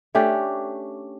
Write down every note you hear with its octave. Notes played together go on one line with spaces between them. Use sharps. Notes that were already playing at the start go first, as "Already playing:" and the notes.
A3 C#4 D4 G4